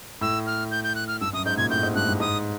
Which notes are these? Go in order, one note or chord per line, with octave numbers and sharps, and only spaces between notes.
A2 E6
F6
G6
G6
F#6
F6
G2 E6
F#2 D#6
G#2 G6
A#2 G#6
A2 G6
G#2
G2 F#6
G2
G#2 D#6